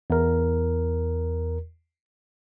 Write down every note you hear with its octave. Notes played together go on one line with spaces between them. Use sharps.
E2 A#4